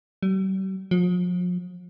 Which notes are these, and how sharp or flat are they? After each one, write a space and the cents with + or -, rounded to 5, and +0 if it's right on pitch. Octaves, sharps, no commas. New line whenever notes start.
G3 -45
F3 +40